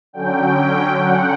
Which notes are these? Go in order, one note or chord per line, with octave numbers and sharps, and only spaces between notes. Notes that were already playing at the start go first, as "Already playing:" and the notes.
D3 F#3 C#4 G5
F#5